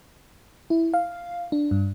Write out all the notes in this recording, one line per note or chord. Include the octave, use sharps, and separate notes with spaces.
E4
F5
D4
G2